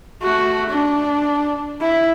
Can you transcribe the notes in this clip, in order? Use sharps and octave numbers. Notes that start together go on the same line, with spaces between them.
A3 F#4
D4
E4